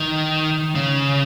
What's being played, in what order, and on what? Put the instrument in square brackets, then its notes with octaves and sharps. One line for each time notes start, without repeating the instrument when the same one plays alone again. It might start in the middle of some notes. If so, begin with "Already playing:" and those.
Already playing: [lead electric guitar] D#3
C#3